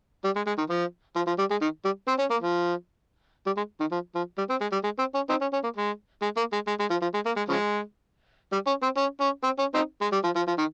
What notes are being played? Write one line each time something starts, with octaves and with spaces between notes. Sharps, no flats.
G3
G#3
G#3
D#3
F3
F3
F3
G3
G#3
D#3
G3
C4
C#4
A#3
F3
G3
G#3
D#3
F3
F3
G3
C4
G#3
G3
G#3
C4
C#4
C4 D#4
C#4
C#4
A#3
G#3
G#3
A#3
G#3
G#3
G#3
F3
F3
G#3
A#3
G#3
C#3 F3 G#3
G3
C#4
C4
C#4
C#4
C4
C#4
C4 D#4
G#3
G3
F3
F3
F3
D#3